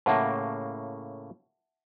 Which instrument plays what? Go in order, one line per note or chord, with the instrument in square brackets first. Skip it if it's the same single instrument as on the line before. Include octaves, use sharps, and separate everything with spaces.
[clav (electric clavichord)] A2 C#3 A#3 [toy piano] E5 F#5 A5